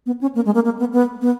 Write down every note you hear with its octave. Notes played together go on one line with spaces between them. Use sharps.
B3
C#4
A#3
G#3
A#3
A#3
B3
B3
B3